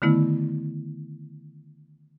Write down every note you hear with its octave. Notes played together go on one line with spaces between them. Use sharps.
D3 D#3 A3 B3 E4